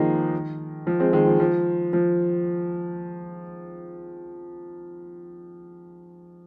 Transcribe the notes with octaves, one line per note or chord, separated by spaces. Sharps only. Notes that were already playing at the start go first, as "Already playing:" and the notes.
Already playing: D#3 F3 G#3 A#3 D#4
F3
G#3 C4
D#3 G#3
F3
F3
F3